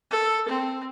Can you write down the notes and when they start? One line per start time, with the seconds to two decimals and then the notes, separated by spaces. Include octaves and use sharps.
0.11 A4
0.48 C4